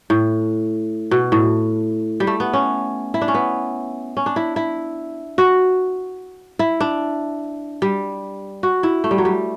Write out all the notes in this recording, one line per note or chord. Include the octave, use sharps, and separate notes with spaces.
A2
B2
A2
G3
A3
B3
C#4
E4
D4
C#4
B3
C#4
D4
E4
E4
F#4
E4
D4
G3
F#4
E4
A3
G3
F#3
G3